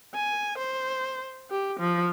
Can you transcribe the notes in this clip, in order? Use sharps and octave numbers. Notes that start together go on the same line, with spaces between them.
G#5
C5
G4
F3